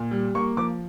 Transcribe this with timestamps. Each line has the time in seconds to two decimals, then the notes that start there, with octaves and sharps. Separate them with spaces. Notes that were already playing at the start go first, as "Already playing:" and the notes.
Already playing: A#2
0.11 G3
0.35 A#3 C#6
0.57 F3 D6